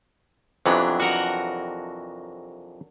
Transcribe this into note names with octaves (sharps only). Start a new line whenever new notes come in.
F2 C3 E3 F#3 B3 D4
F#4 A#4 F#5